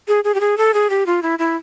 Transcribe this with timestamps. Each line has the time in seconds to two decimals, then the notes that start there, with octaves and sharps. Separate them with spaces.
0.08 G#4
0.24 G#4
0.35 G4
0.40 G#4
0.58 A4
0.74 G#4
0.90 G4
1.06 F4
1.23 E4
1.39 E4